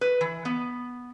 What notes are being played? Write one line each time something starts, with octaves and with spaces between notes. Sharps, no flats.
B4
E3
B3